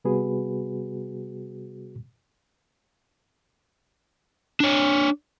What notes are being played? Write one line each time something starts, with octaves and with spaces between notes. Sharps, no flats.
C3 G3 B3 F#4 G#4 B4
D4 C#5